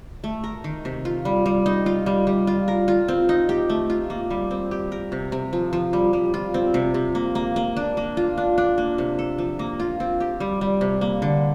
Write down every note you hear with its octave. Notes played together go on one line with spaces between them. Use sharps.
A3
A#4
D#3
C3
F4
G3
G3
D#4
F4
G3
G3
F4
A#4
F4
C4
D#4
G4
A3
F4
A#3
G3
C4
G4
A#4
C3
C3
F3
F3
G3
G3
F4
C4
C3
C3
A#3
A#3
A#3
D4
A#3
F4
D4
D4
A#3
C3
A4
F3
A#3
F4
C4
G4
G3
G3
C3
A#3
D3